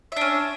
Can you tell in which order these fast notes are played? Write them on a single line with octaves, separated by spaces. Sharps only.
E5 D4 C#4